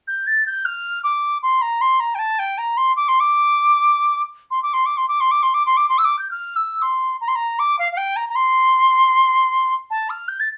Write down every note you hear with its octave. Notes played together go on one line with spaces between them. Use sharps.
G6
A6
G6
F6
D6
C6
A#5
C6
A#5
G5
A5
G5
A#5
C6
D6
C6
D6
C6
D6
C6
D6
C6
D6
C6
D6
C6
D6
C6
D6
C6
E6
D6
G6
F6
E6
C6
A#5
C6
A#5
D6
F5
F5
G5
A#5
A#5
C6
A5
F6
G6
A6